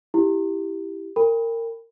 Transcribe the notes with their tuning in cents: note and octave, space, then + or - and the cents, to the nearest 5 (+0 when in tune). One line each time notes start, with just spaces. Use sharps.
E4 +0 G4 +0
A#4 -25 G5 +35 B5 +0